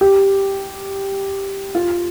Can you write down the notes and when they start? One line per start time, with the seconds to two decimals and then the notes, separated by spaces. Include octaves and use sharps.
0.01 G4
1.75 F4